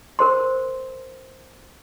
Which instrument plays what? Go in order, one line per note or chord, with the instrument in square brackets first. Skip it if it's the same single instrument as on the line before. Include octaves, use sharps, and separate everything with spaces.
[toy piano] A#4 C5 C6